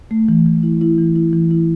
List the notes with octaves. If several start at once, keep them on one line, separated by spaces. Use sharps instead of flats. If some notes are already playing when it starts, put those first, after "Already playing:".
A3
E3
E3
E4
E4
E3
E4
E3
E4